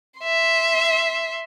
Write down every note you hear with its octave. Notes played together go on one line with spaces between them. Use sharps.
E5 C6